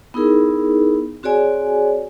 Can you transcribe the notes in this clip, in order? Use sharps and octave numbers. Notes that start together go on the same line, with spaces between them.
B3 D#4 E4 G#4 A#4
C4 F#4 G#4 C#5 D5 G#5